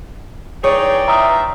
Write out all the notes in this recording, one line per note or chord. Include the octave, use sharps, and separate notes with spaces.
E3 D#4 G#4 C#5 D5 G5
D#4 F4 E5 A#5 D#6